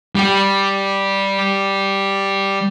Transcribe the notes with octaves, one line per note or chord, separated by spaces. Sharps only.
G3 G4